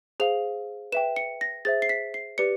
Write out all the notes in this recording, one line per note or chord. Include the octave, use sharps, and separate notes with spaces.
G#4 C5 F5 F7
B4 E5 G5 E7
C#7
A#6
G#4 C5 E5 A6
C7
B6
C7
G4 B4 D5 C#7